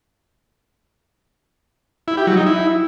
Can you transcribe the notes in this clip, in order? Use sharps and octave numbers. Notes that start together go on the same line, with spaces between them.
E4
G4
F#3
D#4
E4